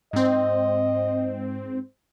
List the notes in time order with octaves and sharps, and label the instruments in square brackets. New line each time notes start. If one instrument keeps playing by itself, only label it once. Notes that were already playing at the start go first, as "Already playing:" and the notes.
[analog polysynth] G#2 C4 [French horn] D#5